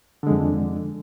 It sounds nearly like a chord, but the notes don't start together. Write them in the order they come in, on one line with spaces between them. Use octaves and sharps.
D3 G#3 F2